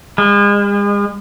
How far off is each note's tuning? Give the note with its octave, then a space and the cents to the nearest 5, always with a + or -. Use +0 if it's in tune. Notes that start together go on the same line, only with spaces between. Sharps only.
G#3 -40